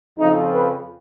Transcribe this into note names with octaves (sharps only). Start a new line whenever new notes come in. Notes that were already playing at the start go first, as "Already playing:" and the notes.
F2 C#3 F3 D#4
B4